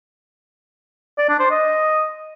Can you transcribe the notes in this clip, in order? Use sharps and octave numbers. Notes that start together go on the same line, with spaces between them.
D5
D4
C5
D#5